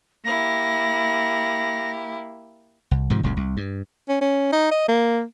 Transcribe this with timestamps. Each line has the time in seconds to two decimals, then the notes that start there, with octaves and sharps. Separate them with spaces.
0.25 A#3 E4 G4 A#6
2.91 C2
3.10 G#2 C3 D#3 F3
3.23 F#1 C#2 A#2 C#3
3.37 C2
3.57 G2
4.09 C#4
4.21 C#4
4.52 D#4
4.71 D#5
4.88 A#3